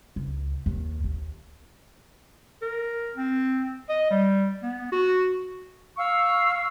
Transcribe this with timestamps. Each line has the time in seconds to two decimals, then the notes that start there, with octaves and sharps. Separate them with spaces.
0.16 C#2
0.66 D#2
1.04 D#2
2.62 A#4
3.15 C4
3.89 D#5
4.11 G3
4.63 B3
4.92 F#4
5.97 F5 C#6 E6